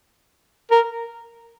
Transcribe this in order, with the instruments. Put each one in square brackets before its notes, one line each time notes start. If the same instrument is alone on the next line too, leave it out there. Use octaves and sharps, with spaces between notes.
[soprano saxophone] A#4